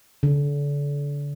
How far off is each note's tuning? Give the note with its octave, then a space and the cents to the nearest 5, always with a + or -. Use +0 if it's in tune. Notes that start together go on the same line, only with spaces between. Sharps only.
D3 -35